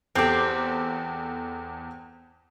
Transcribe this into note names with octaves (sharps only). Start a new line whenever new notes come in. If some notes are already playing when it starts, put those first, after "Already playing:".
E2 C4 G4 A4 D6